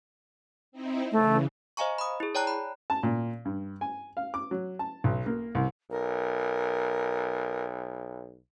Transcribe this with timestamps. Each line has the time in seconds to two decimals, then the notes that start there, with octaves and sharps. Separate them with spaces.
0.72 C4 D#4 E4
1.12 C#3 E3 A3
1.77 C5 D#5 F5 G#5 A#5 C#6
1.98 B5 D#6
2.20 E4 G#4
2.35 C#5 D5 G5 A5 A#5 F#6
2.47 B5
2.90 A5
3.03 A#2
3.45 G2
3.81 G#5
4.17 F5
4.34 D6
4.51 F#3
4.79 A5
5.04 B1
5.26 A#3
5.55 C2
5.91 B1 A#4